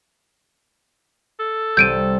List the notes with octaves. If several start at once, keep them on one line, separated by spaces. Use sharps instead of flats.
A4
C2 C3 G6 D7 D#7